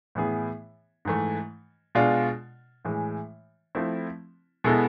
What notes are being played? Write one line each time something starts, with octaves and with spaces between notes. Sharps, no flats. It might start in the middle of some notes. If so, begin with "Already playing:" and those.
A2 E3 B3 E4 G#4
G#2 E3 A3
B2 G#3 D4 F4
A2 E3 G#3
F3 A3 C4 E4
B2 G#3 B3 E4 A4